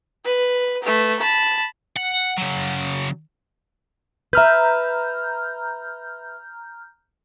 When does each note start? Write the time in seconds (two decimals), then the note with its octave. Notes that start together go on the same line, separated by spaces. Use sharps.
0.24 B4
0.83 A3 B4
1.19 A5 B5
1.96 F#5
2.37 C#3 F#3
4.33 B4 E5 A#5 F6 G6